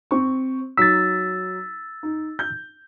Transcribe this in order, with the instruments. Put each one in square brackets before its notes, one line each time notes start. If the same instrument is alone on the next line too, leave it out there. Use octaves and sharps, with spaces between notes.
[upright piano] C4 C#6
[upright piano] F#3 D#4 B6 [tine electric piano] E6 A6
[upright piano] D#4
G6